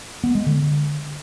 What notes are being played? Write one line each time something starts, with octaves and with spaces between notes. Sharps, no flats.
B3
G#3
D3